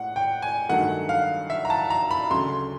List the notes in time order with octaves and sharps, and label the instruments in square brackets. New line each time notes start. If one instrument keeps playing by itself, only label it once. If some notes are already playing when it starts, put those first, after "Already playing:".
Already playing: [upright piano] A2 G#3 F#5
G5
G#5
G2 D#3 F#3 A3 F#5
F5
E5
A#5
A5
A#5
B5
D2 C#3 F#3 A3 C6